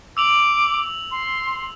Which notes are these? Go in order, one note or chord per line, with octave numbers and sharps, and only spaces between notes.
D6 E6 F7 F#7
C6